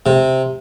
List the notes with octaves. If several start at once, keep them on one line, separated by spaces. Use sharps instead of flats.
C3